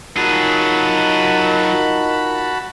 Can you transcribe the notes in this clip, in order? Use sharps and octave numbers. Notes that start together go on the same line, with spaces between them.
F#3 D#4 F4 F#4 G#4 A#4 A5 B5